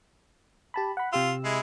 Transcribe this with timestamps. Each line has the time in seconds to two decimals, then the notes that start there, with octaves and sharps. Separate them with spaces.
0.74 G4 A5 B5
0.97 F#5 B5
1.13 C3 F4 G4 E6
1.45 G#3 E4